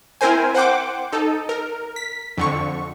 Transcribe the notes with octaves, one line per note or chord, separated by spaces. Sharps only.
C4 E4 A#4 C5 G#5
C5 F#5 G5 D6
D#4 A4
A#4
B6
F2 D3 C#6